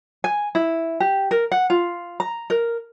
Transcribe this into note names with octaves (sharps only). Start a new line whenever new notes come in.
G#5
E4
G4
A#4
F#5
F4
A#5
A#4